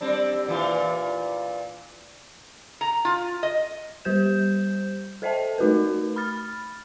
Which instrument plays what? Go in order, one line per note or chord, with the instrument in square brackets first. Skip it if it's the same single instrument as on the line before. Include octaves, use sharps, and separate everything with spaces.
[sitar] G3 C4 D4
A#2 E3 F4
[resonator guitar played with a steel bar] A#5
F4
D#5
[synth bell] G3 G4 C5 G6 E7
A4 C5 D#5 E5 G5 A5
A3 D#4 F#4 A#4 B4
B5 F6 A6